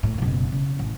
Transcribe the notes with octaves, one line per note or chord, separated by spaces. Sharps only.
A2
F#1 B2
C#3
A1